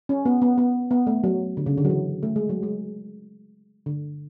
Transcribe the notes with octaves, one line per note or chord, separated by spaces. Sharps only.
C#4
B3
B3
B3
B3
A3
F#3
D3
C#3
D3
F#3
E3
A3
G#3
F#3
G#3
D3